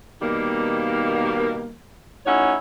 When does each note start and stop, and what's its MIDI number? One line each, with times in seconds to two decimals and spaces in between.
0.22 1.73 47
0.22 1.73 51
0.22 1.73 55
0.22 1.73 58
2.26 2.55 45
2.26 2.55 61
2.26 2.55 63
2.26 2.55 64
2.26 2.55 66
2.26 2.55 73